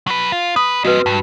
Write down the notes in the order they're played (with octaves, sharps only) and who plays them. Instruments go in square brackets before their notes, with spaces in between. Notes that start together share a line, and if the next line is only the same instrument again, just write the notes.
[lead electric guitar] F#3 B4
F4
[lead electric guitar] B4 [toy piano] D#6
[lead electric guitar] C4 D#5 [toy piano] F#4 B4
[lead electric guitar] G2 [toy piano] A5